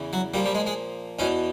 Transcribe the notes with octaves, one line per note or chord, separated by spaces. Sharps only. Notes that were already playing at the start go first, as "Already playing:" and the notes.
Already playing: E2 C#3 E3
F#3
A#2 F3 G3
G3
G#3
G#3
E2 B2 C#4